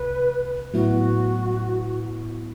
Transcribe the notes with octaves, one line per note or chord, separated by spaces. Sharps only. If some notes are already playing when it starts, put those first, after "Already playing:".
Already playing: C2 C3 B4
A2 F#3 B3 E4 F#4